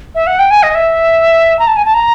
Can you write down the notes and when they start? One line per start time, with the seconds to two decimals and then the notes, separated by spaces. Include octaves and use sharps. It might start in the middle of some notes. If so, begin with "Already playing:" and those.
0.15 E5
0.27 F#5
0.39 G5
0.51 G#5
0.63 D#5
0.75 E5
1.59 A#5
1.67 A5
1.76 G#5
1.85 A5
1.94 A#5